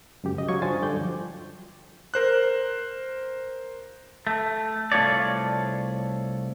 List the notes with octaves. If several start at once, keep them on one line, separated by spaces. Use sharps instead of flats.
C#2 F#2 G4
C#3 D#5
F#3 F5 C#6 G#6
G2 D4 F4 C5 G#5 A6
D2 G2 D3 D5 G5 G6
F3
A#4 C5 F#6
A3
C2 A3 F4 C#5 D5